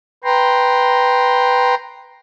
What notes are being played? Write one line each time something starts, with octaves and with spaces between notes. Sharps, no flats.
B4 G5 A#5 C6